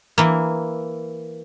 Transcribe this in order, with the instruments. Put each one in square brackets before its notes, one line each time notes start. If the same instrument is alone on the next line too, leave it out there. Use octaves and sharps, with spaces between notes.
[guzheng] E3 A#3